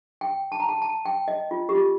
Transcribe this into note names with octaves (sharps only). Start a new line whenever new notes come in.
G5
A5
A#5
A5
A5
G5
D#5
F4
G4
F4